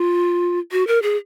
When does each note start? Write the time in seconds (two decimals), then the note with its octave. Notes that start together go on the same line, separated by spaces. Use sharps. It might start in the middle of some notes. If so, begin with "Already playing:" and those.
Already playing: F4
0.72 F#4
0.87 A#4
1.02 G#4